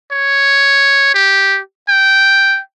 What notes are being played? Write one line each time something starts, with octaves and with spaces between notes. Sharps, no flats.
C#5
G4
G5